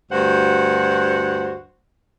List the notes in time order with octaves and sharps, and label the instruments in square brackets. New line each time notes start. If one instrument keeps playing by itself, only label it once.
[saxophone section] D2 G2 F#4 C5 F#5